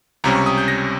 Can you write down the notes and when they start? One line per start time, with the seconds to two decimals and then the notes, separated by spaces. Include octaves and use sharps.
0.24 C#2 C3 G3 C#4 A#5
0.35 C#6
0.46 D#6
0.58 G6
0.68 A#6